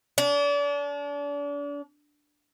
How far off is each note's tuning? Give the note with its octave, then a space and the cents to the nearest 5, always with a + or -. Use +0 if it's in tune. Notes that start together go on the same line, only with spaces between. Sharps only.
D4 -35